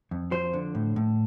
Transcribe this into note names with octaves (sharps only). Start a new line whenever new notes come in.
F2
F3 C5
D3
A2
A2